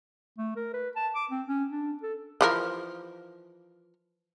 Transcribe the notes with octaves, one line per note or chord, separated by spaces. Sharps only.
A3
A#4
B4
A5
D6
C4
C#4
D4
A4
E3 F3 A#4